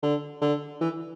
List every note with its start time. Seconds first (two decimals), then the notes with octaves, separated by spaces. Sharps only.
0.03 D3
0.42 D3
0.81 E3